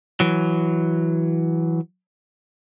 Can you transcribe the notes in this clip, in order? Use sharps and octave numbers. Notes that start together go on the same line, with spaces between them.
E3 F#3